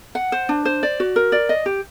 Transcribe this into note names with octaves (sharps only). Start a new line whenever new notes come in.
F#5
C5
D4
C5
D5
F#4
A#4
D5
D#5
G4